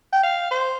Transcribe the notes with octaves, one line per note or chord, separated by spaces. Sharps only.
G5
F5
C5